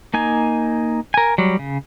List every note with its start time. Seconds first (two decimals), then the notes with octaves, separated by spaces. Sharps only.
0.14 A#3 D#4 G#5
1.14 A#4 G#5
1.38 F#3 G3
1.59 C#3